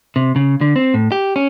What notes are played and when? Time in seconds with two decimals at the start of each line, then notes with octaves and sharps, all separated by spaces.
0.16 C3
0.36 C#3
0.61 D3
0.76 C4
0.94 A2
1.12 G4
1.36 C#4